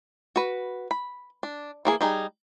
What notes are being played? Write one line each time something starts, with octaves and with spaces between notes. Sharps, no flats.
F#4 B4
B5
D4
E3 A#3 G#4
G3 D#4 G#4